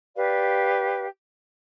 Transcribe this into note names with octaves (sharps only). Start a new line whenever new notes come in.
G4 B4 D5 F5